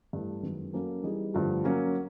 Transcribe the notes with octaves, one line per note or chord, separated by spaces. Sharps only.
G2 E3 A3
F#2 D#3 G#3 B3
F#3 A#3 C#4 F#4 A4
E3 G3 B3 D#4 G#4
G2 D3 F3 A3
F#3 A#3 C#4